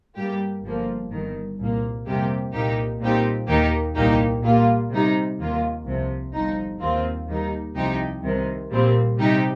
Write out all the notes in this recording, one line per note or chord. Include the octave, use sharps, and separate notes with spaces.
G2 G3 A#3 G4
G1 G2 F3 A#3
G1 G2 D#3
C2 A#2 A#3
F2 C3 G3 A#3 G4
C2 A#2 A#3 D#4 G4
A#2 G3 C4 D#4 G4
D#2 D#3 A#3 D#4 G4
C2 A#2 A#3 D#4 G4
A#2 G3 A#3 F4
C3 G3 D#4
D#2 D#3 A#3 F4
C2 C3 F3
G1 G2 F3 D#4
D#2 D#3 C4 F4
D#2 D#3 G3 D#4
C2 C3 F3 D#4 G4
C2 C3 D#3
A#1 A#2 G3 C4
C3 G3 D#4 G4